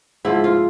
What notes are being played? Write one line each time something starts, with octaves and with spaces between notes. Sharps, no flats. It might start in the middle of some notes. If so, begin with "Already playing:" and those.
G#2 F3 E4
F4